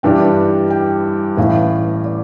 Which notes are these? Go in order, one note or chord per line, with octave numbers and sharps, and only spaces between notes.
G2 E3 G3 D4 G5
G5
A1 A2 E3 F5
D5